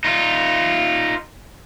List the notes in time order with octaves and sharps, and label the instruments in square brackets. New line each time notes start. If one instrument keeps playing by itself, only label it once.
[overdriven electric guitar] D#4 F4